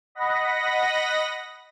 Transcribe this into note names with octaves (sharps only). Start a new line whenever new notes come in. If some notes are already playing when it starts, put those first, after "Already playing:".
D#5 F#5 B5 A#6